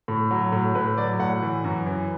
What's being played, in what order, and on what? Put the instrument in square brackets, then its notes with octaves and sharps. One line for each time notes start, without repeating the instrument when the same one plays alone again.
[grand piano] A2
F#3
A2
A2 B4
F#3 D5
A2 F#5
E3
F#2
E3